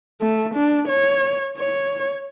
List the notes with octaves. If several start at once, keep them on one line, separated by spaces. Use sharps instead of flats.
A3
D4
C#5
C#5